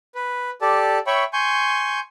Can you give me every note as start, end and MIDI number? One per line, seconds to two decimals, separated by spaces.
0.15 0.51 71
0.62 0.99 67
0.62 0.99 69
0.62 0.99 74
0.62 0.99 81
1.07 1.24 73
1.07 1.24 76
1.07 1.24 79
1.07 1.24 83
1.07 1.24 85
1.33 2.00 80
1.33 2.00 84
1.33 2.00 85
1.33 2.00 91